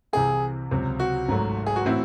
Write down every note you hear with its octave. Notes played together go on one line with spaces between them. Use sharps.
C2 C3 E3 C4 E4 G#4
C#2 C3 F#3 C4
F#4
G#1 G#2 F#3 A3
G#4
F#4
A2 E3 C4 E4